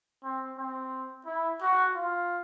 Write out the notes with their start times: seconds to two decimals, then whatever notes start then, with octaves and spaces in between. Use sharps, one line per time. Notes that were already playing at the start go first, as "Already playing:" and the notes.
0.24 C4
0.58 C4
1.25 E4
1.61 F#4
1.95 F4